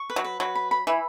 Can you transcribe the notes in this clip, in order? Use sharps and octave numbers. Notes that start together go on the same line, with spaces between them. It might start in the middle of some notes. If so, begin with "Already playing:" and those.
Already playing: C#6
B4
F#3
B4
F#3 B4
B5
B5
E3 B5